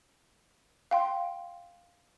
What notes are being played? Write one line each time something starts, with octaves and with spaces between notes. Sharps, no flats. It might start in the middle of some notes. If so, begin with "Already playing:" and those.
F5 G5 C6